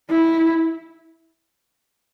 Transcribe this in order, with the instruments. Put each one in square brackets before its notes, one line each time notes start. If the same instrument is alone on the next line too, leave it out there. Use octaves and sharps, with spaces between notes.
[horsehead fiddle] E4